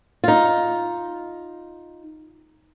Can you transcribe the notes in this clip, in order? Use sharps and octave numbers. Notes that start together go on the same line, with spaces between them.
D#4 F4